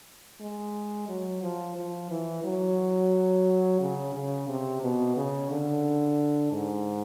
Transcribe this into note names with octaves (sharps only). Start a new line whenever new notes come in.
G#3
F#3
F3
F3
E3
F#3
C#3
C#3
C3
B2
C#3
D3
G#2